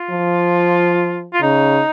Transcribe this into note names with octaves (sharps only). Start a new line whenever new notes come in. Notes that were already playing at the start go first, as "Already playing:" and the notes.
Already playing: F4
F3
F4
C#3 D#4